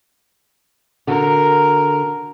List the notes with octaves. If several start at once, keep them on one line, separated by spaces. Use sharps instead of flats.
D3 F#4 A#4